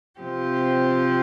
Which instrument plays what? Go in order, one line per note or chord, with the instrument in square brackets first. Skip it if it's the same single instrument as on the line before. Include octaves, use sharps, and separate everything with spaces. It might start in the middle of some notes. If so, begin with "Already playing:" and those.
[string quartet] C3 F3 C4 G4